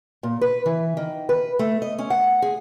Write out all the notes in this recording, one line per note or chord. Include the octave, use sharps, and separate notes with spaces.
A#2
B4
E3
D#3
B4
A3
D#5
C#4
F#5
G#4